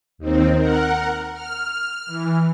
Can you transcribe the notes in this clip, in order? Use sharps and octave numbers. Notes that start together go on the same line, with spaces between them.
D#2 D#3 C4
A#4 F#5
F6
E3